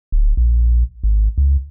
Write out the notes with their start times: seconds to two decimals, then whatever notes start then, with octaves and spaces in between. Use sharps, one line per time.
0.12 D1
0.37 A#1
1.03 G#1
1.38 C#2